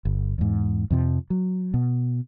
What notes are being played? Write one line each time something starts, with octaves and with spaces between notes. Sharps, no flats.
G1
E2 G#2
F2 C3 F3
F#3
B2